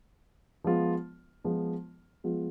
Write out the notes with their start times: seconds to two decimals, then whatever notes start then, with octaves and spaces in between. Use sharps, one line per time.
0.64 F3 G#3 B3 F4
1.44 F3 G#3 B3 F4
2.24 F3 G#3 B3 F4